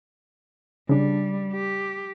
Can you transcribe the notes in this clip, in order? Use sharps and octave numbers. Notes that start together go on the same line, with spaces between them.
C#3 G3 D4
G4